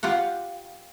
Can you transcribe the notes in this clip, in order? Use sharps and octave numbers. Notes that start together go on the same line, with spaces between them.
F4 G4 F5 F#5